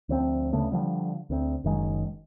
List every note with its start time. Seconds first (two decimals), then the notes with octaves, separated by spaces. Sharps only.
0.09 D2 F3 C4
0.53 D2 C#3 A3 B3
0.72 D3 D#3 F3 G3
1.30 D2 C4
1.64 F#1 D#3 G#3